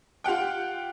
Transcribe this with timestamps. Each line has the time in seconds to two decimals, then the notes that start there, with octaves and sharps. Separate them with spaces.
0.24 F4 G4 F#5 G5